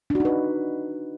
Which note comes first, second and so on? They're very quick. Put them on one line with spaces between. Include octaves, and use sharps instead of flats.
D4 F#4 D#4 B4